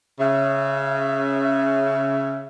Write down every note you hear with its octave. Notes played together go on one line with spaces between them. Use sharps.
C#3 E5